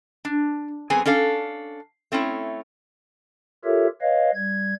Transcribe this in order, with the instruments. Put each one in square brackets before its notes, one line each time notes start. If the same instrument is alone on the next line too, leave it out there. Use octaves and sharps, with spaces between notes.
[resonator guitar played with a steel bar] D4
F#2 B3 C4 G#4 G#5
C#4 D4 A4 F5
A3 C4 C#4 E4
[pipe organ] F4 G4 A4 A#4 C#5 E5
B4 C#5 D#5 F5
G3 G#6